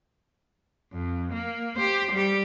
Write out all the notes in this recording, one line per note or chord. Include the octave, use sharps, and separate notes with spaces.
F2
A#3
G4 C5
G3 G4